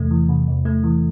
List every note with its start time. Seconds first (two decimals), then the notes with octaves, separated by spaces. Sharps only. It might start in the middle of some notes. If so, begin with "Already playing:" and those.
Already playing: E2 C3 A3
0.11 E3
0.29 C3
0.47 E2
0.65 A3
0.84 E3